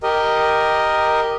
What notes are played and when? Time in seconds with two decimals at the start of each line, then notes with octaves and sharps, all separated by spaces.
0.03 G4 A#4 D#5